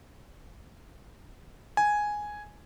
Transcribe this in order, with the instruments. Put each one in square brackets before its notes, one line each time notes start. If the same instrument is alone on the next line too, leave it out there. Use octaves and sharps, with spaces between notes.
[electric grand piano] G#5